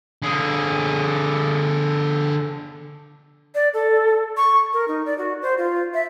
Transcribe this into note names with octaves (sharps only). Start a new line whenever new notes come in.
D3 G#4
D5
A4
C#6
A#4
D#4
D5
F#4
C5
F4
E5